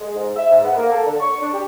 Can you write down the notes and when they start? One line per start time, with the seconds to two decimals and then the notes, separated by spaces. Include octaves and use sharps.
0.01 G#3
0.15 G#2
0.37 E5
0.51 G#2
0.64 B3
0.77 A#3
0.92 A4
1.06 D3
1.20 C#6
1.42 D4
1.54 G4